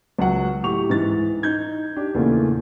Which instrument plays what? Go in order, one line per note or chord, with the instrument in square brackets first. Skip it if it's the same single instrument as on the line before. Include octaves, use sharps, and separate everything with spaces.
[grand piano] C#2 F#3 F#5
A2 G4 C#6 F7
G#2 E3 D#4 A6
D#4 G6 G#6
D4 G4
E2 A#2 C#3 A3